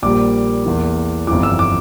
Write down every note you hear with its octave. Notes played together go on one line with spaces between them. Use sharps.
A#1 A#2 G3 A#3 D6
E2 E3 A#3
G1 F2 E3 D6
E6
D6